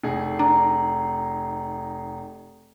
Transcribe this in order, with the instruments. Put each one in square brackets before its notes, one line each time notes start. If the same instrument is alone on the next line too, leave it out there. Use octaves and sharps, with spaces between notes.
[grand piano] F1 D#4 G#4
[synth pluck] D4 [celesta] A#5